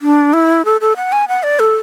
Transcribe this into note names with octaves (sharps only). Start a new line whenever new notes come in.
D4
E4
A4
A4
F#5
G#5
F#5
D5
A4